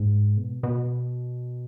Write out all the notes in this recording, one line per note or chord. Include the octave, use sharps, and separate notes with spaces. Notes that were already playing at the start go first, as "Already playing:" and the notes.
Already playing: G#2
B2
B2